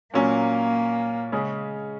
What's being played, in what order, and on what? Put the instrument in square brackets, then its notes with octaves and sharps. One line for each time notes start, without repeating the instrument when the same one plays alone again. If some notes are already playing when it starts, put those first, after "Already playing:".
[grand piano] A#2 F#3 C#4 [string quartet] A#3
[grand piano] C#3 G#3 C#4